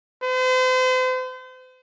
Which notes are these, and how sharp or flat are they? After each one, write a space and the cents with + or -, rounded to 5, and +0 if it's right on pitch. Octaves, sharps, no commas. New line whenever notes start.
C5 -40